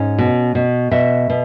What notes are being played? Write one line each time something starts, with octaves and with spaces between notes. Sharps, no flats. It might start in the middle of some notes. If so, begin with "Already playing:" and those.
Already playing: G#2 C#4
B2
B2
B2 E5
B2